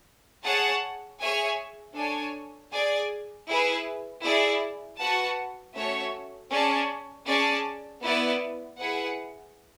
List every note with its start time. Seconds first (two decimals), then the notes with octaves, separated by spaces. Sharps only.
0.45 G#4 C#5 F#5 A5
1.21 G#4 C#5 E5 G#5
1.96 D4 A4 C#5 G#5
2.73 G#4 D5 G#5
3.49 E4 G#4 B4
4.24 E4 G#4 D5
5.00 F#4 B4 F#5 A5
5.76 A3 C#4 F#4 C#5 E5
6.51 C#4 G#4 D5 A5
7.27 C#4 G#4 D5 A5
8.03 B3 E4 B4 D5
8.79 E4 G#4 B4 F#5